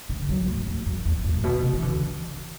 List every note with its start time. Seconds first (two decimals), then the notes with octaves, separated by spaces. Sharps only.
0.09 D3
0.29 F#3
0.48 A2
0.67 E2
0.86 F#2
1.05 E2
1.24 F#2
1.34 A2
1.44 B2
1.63 C3
1.73 E3
1.82 D3